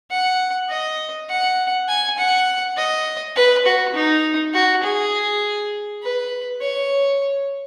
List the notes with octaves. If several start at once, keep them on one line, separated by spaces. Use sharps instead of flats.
F#5
D#5
F#5
G#5
F#5
D#5
B4
F#4
D#4
F#4
G#4
B4
C#5